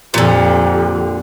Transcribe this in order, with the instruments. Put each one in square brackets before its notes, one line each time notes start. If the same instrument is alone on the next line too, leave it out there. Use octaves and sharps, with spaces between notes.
[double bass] F2 [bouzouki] A#2 D3 [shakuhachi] G4